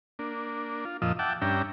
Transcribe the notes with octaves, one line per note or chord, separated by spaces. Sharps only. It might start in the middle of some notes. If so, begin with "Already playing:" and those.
A#3 D4
F4
F2 A#2 F3 F4 D#5 E6
E5 F#5 G5 A5 D6
G2 C#4 D4 E5 G5 A#5